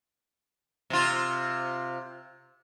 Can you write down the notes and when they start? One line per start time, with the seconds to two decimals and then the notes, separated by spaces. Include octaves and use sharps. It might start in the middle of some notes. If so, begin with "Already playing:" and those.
0.90 C3 F4